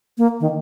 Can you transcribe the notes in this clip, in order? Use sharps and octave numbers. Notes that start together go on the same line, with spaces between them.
A#3
D#3